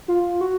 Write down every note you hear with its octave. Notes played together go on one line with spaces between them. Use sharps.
F4
F#4